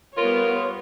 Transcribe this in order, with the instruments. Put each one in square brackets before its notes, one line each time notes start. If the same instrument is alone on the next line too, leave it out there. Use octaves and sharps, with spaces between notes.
[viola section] G3 B3 C#5 [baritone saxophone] F4 [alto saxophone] A#4